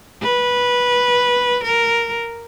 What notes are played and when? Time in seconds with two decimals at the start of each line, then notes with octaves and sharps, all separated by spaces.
0.23 B4
1.64 A#4